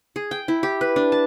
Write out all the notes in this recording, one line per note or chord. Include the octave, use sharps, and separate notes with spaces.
G#4
G5
E4
G4
B4
D4
A5